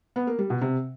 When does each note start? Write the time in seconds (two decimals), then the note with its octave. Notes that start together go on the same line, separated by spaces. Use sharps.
0.16 B3
0.27 A#3
0.39 G3
0.50 B2
0.61 C3